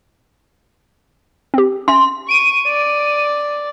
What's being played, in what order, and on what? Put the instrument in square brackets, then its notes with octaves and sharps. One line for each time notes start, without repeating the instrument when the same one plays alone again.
[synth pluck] C4 G4
[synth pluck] C#4 E5 [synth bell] C6
[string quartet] C#6 [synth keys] D7 D#7
[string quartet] D5